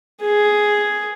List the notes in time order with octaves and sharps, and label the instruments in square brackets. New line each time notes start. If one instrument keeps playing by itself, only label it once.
[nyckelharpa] G#4